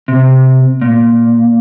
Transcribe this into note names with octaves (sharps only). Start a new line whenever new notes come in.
C3
A#2